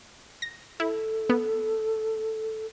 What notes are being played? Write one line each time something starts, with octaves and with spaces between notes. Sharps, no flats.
A#6
E4 A4
B3